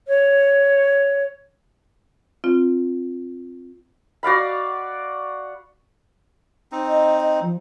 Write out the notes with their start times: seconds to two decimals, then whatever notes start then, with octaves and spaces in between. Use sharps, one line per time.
0.08 C#5
2.44 C4 F4
4.23 F#4 D5 F5 B5
6.72 C4 D#4
6.87 D#5
7.21 D#5
7.42 F3